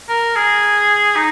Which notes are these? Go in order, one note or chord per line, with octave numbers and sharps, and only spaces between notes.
A#4
G#4
D#4